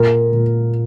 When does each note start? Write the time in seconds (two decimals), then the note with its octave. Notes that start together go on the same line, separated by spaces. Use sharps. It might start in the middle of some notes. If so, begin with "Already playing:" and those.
Already playing: A#2 A#4
0.33 A#2